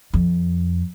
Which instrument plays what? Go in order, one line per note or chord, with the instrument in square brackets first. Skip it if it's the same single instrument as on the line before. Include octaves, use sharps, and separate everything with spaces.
[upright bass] F2